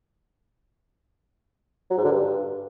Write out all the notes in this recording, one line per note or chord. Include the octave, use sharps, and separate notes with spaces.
F#3
G#2
D3
G2